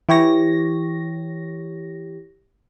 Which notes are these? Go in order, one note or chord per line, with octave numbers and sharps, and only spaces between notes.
E3 G4 C#5 A#6